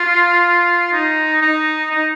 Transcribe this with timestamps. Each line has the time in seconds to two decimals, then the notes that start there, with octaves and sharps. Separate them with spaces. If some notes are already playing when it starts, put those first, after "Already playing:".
Already playing: F4
0.93 D#4
1.42 D#4
1.91 D#4